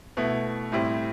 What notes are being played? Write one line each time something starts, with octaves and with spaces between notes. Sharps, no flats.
B2 A3 E4
A2 G3 C4 E4